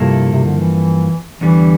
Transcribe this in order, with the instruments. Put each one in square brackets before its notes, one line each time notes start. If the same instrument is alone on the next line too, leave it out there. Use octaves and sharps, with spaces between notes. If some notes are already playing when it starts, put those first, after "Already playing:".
Already playing: [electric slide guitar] G2 F3 A#3 E4 A4 [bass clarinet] C3
[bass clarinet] C3
D3
E3
[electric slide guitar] E2 D3 G3 [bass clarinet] E3